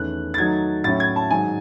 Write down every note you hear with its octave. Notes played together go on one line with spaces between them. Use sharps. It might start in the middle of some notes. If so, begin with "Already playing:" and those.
Already playing: E2 D#3 A3 C#4 F#6
A6
D#3 F#3 A3 D#4 G#6
A2 F#3 C#4 E4 A6
G#6
A5
G#2 D#3 F#3 G#5